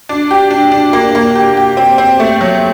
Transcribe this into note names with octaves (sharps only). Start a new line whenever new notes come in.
D4
G4
D4
D4
A#3
A#3
G4
G4
C4
C4
A3
F#3